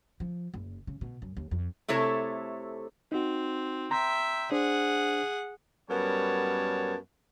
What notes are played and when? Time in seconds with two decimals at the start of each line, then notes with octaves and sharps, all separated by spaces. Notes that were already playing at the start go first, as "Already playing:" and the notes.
0.20 F3
0.54 F#1
0.87 C#3
1.01 B2
1.22 F#2
1.37 D#2
1.51 F2
1.88 C3 A3 E4 A4 C#5
3.12 C4 D#4 F#4
3.91 E5 G5 A#5 C6 G6
4.52 D4 G#4 C5 F#5
5.90 F#2 G3 B3 A#4 C#5 A5